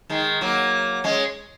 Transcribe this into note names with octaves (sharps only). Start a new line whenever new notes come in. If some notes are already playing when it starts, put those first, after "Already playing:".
D#3 G#3
F#3 A#3
G#3 C#4